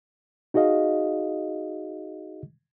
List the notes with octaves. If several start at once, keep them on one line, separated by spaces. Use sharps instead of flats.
D#4 F#4 G#4 D#5 F5